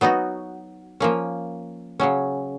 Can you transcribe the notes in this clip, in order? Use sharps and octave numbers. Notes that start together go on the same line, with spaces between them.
F#3 B3 D#4 F#4
F3 A#3 C#4
C#3 F#3 C#4